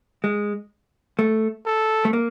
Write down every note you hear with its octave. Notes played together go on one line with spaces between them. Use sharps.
G#3
A3
A4
A3
A#3